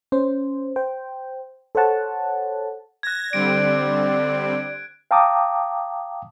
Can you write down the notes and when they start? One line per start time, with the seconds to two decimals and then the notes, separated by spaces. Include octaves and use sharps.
0.12 C#4 C5
0.76 C5 G5
1.75 A4 C5 C#5 F#5 A5
3.03 F#6 G#6 A#6
3.33 D3 G3 C4 D5 D7
5.11 F5 G5 A5 A#5 D6 D#6